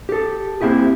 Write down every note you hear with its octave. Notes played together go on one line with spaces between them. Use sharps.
G4 A4
A#3 C4 E4 G4 G#4